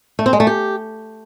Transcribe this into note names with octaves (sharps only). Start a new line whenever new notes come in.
A3
C4
G#3
A3
G4